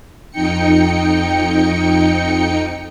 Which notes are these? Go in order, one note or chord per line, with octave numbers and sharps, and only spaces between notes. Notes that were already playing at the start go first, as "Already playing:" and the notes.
F2 D#4 G5 C#7